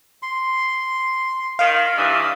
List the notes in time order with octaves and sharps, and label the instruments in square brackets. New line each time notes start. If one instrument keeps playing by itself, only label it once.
[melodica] C6
[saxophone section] D#3 [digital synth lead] F5
[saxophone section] G2 E3 [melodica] D#6